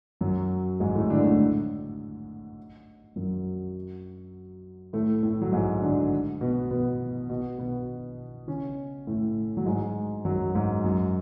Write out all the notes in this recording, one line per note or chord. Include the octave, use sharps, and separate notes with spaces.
F#2 F#3
G#2 G#3
A2 A3
D3 D4
A2 A3
F#2 F#3
A2 A3
A2 A3
F#3
G#2 G#3
D3 D4
B2 B3
B2 B3
B2 B3
B2 B3
C#3 C#4
A2 A3
F#3
G#2 G#3
F#2 F#3
G#2
F#2